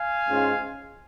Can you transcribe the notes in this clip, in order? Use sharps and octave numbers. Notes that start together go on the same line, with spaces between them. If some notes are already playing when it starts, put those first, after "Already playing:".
Already playing: F5 G#5
G#2 G#3 C#4 F4